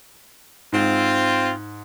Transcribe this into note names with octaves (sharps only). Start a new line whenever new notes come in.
G#2 C4 F4